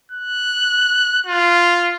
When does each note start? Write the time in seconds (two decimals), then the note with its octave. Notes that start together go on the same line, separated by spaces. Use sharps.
0.11 F#6
1.26 F4